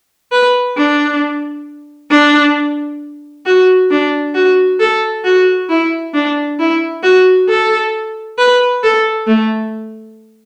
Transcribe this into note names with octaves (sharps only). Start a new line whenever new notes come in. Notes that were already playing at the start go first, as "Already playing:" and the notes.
B4
D4
D4
F#4
D4
F#4
A4
F#4
E4
D4
E4
F#4
A4
B4
A4
A3